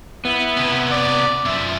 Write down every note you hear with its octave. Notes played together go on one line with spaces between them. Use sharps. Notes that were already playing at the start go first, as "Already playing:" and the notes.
B3 E4
C3 C#4
D5
F#2 F3 E5